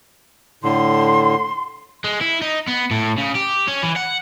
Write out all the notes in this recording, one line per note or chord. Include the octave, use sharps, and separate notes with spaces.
A2 D3 C6
G#3
E4
D#4
B3
A2
C#3
G4
C#4
E3
F#5